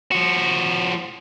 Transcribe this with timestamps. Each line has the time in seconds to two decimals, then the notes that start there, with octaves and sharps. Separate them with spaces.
0.12 F3 F#4